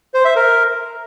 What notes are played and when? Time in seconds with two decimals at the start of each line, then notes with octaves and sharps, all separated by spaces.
0.14 C5
0.25 E5
0.36 A#4